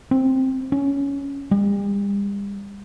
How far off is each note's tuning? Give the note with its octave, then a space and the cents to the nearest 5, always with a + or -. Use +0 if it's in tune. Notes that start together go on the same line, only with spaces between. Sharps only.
C4 +10
C#4 +10
G3 +40